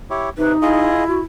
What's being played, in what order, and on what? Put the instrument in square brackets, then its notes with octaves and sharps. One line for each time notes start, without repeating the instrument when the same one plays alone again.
[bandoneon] E4 G4 C#5
[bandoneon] C3 [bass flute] D#4 [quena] B4
[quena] E4 [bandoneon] F4 G#4 D#5
[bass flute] F#4